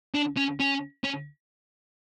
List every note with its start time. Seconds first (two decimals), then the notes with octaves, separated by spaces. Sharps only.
0.14 D4
0.37 C#4
0.60 C#4
1.04 C#4